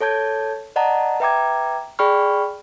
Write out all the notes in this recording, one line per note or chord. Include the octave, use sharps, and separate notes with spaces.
A4 C#5 A5 G6 G#6
D5 D#5 F#5 A5 A#5
B4 E5 G5 A#5 D6 G#6
G#4 D5 G5 B5 C#6 F6